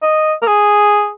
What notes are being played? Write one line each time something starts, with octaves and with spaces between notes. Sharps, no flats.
D#5
A#4
G#4